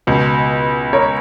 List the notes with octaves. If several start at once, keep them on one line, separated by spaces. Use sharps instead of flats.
C#2 B2
A#4 C#5